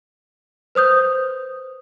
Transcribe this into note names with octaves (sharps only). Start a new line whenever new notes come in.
B4 C5 D#6 G6